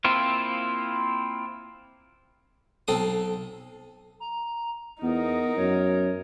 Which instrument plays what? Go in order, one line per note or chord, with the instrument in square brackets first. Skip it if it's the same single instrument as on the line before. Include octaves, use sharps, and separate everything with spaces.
[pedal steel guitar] A#3 C4 E4 F4
[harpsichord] B1 C4 A4 D#6
[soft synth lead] A#5
[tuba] E2 [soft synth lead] B3 [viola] D#4 A#4
[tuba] F#2 [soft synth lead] C#5